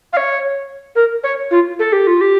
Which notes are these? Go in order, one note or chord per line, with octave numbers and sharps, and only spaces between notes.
F5
C#5
A#4
C#5
F4
A4
G4
F4
G4